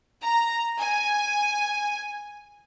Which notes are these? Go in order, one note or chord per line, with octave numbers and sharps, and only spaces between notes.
A#5
G#5